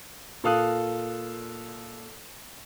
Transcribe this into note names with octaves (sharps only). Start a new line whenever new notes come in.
A#2 A4 F5 D#6 F#6